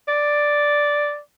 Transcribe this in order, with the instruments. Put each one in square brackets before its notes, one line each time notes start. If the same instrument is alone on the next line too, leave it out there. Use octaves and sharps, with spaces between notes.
[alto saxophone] D5